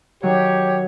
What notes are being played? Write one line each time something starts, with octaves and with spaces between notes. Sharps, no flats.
D#3 F#3 G4 C#5